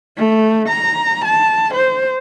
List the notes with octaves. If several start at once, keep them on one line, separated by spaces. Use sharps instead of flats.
A3
A#5
A5
C5